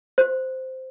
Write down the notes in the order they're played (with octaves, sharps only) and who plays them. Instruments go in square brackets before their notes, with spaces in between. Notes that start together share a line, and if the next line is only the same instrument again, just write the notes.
[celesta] C5